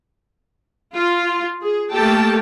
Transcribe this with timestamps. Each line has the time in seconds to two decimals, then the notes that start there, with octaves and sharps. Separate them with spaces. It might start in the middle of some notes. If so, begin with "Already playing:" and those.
0.94 F4
1.61 G#4
1.94 A3 A#3 G4 A4 G5 A5